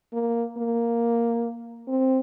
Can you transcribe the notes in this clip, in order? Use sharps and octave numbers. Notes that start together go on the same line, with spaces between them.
A#3
A#3
C4